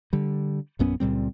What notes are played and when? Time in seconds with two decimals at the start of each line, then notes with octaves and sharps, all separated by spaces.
0.13 D3 G3
0.79 A#1 F#2 B3 C#4
1.00 C#2 A#2 G3 C4